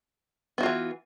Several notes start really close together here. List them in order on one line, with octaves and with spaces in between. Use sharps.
B3 F#4 F4 E3